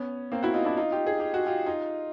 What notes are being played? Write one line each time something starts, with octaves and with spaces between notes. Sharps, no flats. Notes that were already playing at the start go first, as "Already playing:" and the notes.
Already playing: B3 C#4
A#3 C4
E4 F#4
D#4 F4
D4 E4
D#4 F4
F4 G4
G#4
G4
F#4
F4 G4
D#4 F4